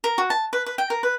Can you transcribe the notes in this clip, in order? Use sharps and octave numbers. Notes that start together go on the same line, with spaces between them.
A#4
F#4
A5
B4
B4
G5
A#4
B4